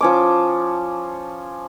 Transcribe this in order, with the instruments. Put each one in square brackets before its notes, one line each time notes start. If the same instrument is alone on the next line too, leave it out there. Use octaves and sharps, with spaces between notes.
[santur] F3 C#4 D6